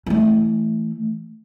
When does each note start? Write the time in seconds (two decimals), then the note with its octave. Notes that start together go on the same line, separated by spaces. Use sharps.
0.06 E3 A3